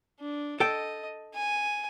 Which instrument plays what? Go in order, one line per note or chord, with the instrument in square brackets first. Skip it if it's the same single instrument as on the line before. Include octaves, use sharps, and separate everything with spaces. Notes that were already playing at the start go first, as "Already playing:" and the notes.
[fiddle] D4
[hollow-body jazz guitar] A4 G5 [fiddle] D#5
[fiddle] G#5